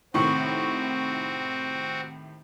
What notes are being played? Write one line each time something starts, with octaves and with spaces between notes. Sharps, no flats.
A2 C3 D#3 C4 F#4 C#6